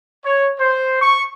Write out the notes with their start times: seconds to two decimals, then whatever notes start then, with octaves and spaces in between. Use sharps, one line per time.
0.25 C#5
0.58 C5
1.02 C#6